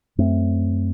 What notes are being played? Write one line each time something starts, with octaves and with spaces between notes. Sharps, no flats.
F#2 A3 C4